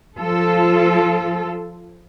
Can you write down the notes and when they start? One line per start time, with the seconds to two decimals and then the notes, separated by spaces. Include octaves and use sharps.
0.19 F3 F4 A4